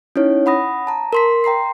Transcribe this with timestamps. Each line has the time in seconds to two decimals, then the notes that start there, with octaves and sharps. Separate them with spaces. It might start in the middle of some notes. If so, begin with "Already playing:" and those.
0.16 C#4 D#4 E4 C#5
0.46 F#5 B5 D#6 A#6
0.87 A5 A#5
1.13 A#4 C6 B6
1.44 G5 A#5 C6 C7